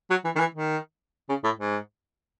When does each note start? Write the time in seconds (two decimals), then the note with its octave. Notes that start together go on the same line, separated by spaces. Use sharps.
0.10 F#3
0.25 E3
0.36 D#3
0.39 E3
0.55 D#3
1.29 C#3
1.44 A2
1.59 G#2